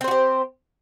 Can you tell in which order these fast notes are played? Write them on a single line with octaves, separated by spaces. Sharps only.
C4 C5 F#4 G4